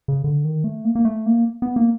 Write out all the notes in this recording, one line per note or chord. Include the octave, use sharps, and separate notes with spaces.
C#3
D3
D#3
A3
A#3
A#3
A3
A#3
B3
A#3